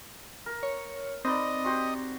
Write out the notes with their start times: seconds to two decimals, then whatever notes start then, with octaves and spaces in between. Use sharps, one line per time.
0.46 A#4
0.63 C#5
1.25 C4 D#4 B4 D5 D#5
1.65 F#4 G4 C6